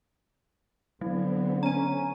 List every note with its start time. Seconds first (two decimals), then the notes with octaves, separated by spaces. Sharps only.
1.01 D3 F#3 B3 C4
1.63 C#4 A#5 D#7